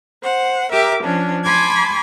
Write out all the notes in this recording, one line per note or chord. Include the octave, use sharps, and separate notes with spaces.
C5 F#5
G4 A#4 E5 D6
F3 C#4 D4
G#5 A5 B5 C6 D6 G#6